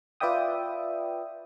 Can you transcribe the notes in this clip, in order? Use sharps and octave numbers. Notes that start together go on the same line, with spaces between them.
F4 B4 D5 E5 G5 D#6